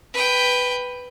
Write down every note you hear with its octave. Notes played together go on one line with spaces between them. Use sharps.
B4 G5